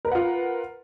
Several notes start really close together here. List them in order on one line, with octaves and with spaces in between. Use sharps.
A#4 B4 F#5 F4